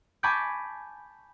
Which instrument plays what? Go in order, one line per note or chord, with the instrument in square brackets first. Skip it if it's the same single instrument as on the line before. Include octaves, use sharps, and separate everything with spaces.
[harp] G#5 A5 B5 C#6 D6 G6